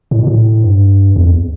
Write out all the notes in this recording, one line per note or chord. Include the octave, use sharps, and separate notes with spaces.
A2
B2
A2
G2
E2
F2
E2